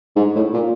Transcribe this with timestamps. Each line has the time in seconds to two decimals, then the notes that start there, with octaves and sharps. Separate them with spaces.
0.16 G#2
0.35 A2
0.53 A#2